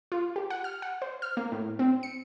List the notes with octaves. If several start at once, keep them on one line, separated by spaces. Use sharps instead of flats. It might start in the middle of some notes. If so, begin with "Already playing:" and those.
F4
G4
F#5
F6
F#5
C5
F6
A#3
A2
C4
C#7